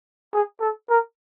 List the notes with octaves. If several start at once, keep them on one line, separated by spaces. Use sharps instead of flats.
G#4
A4
A#4